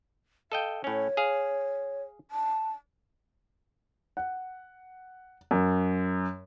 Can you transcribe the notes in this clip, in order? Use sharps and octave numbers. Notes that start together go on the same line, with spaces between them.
A4 D#5 F5 G5
A2 C#4 C#5
G#4 F5
A5
F#5
F#2